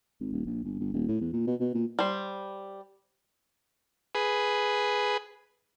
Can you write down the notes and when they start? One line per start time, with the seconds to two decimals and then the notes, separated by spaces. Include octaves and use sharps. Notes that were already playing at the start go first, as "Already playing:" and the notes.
0.20 G#1
0.32 D#1
0.46 A#1
0.64 G1
0.80 G1
0.94 D#1
1.08 A2
1.21 E2
1.33 A#2
1.47 B2
1.60 B2
1.75 A#2
1.99 G3 C5
4.15 G#4 B4